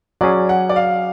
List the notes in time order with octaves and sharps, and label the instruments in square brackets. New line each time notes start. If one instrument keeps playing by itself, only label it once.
[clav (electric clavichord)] F#3 C#4 G#4 [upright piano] D5
[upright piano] F#5
D5
F5